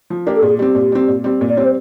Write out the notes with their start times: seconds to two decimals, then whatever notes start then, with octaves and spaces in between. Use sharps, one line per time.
0.10 F3
0.27 A#3 D4 G4
0.36 A4
0.42 A#2 G#4
0.58 G3 C4 G4
0.75 A#2
0.92 G3 C4
1.08 A#2
1.24 G3 C4
1.41 A#2
1.49 D5
1.57 G3 C4 C#5
1.65 C5